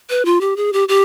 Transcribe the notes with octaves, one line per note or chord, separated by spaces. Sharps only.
B4
F4
G4
G#4
G4
G4